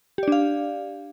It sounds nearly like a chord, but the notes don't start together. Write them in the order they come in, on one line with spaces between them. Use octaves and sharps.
G4 D5 D4 F5